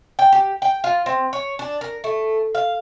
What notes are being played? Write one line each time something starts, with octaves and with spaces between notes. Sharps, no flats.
G5
G4
G5
F4
C4
C#5
D4
A#4
A3
F5